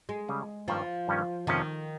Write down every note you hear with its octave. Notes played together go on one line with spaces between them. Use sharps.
G#3
C#3 G3 C#4
G2 D#3 F3 G3 A#3 C#4
G2 D#3 G3 A#3 C#4
F2 C3 D#3 F3 G#3 C#4